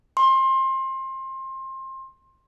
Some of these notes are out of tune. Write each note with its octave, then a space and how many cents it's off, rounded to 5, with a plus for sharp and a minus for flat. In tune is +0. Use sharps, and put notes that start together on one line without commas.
C6 +25